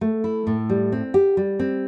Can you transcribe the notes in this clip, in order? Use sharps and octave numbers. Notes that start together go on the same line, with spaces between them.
A3
E4
A2
G3
C4
G4
G3
C4